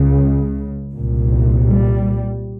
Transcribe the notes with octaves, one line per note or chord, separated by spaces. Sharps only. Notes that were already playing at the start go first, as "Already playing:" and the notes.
Already playing: C#2 C#3
C2 A#2
G3